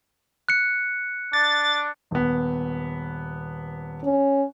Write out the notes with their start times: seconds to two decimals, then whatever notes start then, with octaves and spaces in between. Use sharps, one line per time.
0.49 F#6 C#7
1.33 D4 A6
2.11 D#1 B3
4.04 C#4